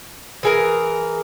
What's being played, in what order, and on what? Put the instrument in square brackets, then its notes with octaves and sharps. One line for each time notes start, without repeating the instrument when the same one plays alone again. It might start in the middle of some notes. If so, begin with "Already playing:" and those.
[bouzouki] E3 G#4 A#4